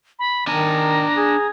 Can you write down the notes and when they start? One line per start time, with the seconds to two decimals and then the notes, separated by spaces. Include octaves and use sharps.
0.19 B5
0.47 D#3 D4 G#5 A#5
1.17 G#4